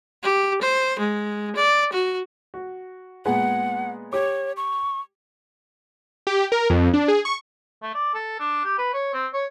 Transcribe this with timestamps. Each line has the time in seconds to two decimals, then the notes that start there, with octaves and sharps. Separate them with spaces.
0.23 G4
0.62 C5
0.99 G#3
1.56 D5
1.93 F#4
2.54 F#4
3.25 A#2 G#3 B3 F#5
4.13 G4 C#5 D6
4.57 C#6
6.27 G4
6.52 A#4
6.70 F2
6.94 D4
7.08 G#4
7.25 C#6
7.82 A3
7.95 D5
8.14 A4
8.40 D4
8.65 G4
8.78 B4
8.93 C#5
9.14 C4
9.33 C#5